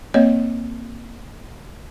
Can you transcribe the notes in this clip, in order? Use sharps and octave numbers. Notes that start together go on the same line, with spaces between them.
A#3 C4 C#5 D#5